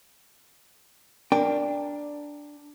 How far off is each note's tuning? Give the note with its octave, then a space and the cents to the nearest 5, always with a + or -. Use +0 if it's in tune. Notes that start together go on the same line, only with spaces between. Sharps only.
D4 +0 A#4 +0 G5 +20